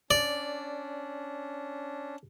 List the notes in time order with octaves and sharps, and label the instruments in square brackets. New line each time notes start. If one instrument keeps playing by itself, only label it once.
[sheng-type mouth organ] C#4 D4 [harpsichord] D5